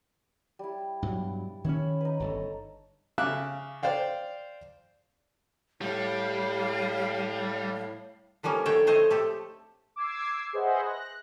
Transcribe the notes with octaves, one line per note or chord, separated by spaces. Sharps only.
G3 E4
G2 B2 F#3
D#3 C4 C#4 C#5 E5 B5
D#4 B4
G1 A4 A#5
C#3 E5 F5 D6 F#6
C5 D5 F5 G5
A2 G3 C#5 F5
D3 F3 G3 A#3 C#4
D3 A3 C#5 G5 A5
A3 C4 C5 C#5 D#5
A3 G4 A4
D6 E6 G#6 C7
G#4 B4 C5 D#5 E5 F#5
F#6 A#6
F#6